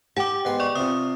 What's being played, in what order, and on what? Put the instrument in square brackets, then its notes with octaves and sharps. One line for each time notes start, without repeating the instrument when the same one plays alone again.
[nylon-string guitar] G4 G5 [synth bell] F#5 D6 [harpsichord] A5
[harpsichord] G#2 B3 C6
[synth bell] D5 C#6
[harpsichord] C3 F3 [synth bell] D#6